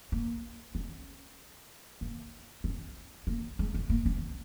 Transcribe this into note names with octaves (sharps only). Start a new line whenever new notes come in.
A#3
C#4
A#3
C#4
A#3
G#3
C#4
A#3
C#4